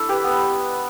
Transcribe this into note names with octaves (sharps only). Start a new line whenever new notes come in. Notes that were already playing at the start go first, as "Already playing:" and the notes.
Already playing: D4 E4 A4
G4 B4
B3